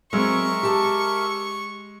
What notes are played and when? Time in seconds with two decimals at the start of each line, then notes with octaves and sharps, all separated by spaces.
0.13 F#3 G#3 C4 A#4 E5 C#6
0.63 G4 A5